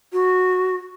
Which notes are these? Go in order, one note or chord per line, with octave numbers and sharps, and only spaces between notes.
F#4